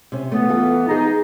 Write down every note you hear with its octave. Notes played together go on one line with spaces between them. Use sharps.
C3 C#4
E3 A3 B3 B4
F4 A4
D#4 G#4 D#5 A#5